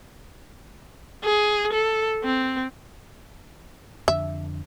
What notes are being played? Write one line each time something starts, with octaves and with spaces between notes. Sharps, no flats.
G#4
A4
C4
F2 D3 E5